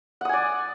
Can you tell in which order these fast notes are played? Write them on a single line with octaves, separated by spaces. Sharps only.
F#5 D#6 G#5 D5